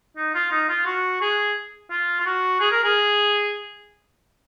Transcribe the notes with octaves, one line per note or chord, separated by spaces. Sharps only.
D#4
F4
D#4
F4
F#4
G#4
F4
F4
F#4
G#4
A#4
G#4